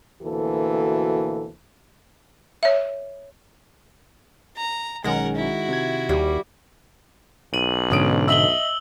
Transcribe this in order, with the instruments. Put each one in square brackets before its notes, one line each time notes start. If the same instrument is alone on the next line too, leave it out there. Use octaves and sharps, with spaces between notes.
[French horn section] D2 B2 E3 A#3 F#4 A4
[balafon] C#5 E5
[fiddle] A#5
[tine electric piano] B1 C#4 [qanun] D#3 A#5 [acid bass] G#3 [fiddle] A#4 F#5
[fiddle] E4 F#4
[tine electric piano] C3 G#6
[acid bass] D#2 [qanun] G3
[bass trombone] B1 [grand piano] D#7 [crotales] F#7
[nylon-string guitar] G#2 B2 D3 [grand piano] C#4 D#6 D7
[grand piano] D#5 E5 [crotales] E6 F#7 G7